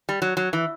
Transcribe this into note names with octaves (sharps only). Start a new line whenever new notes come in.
G3
F#3
F#3
E3